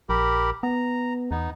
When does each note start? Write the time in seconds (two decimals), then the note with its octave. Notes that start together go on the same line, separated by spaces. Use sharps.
0.09 A#1 G4 A#4 B5
0.63 B3 A#5
1.31 E2 B3 D#4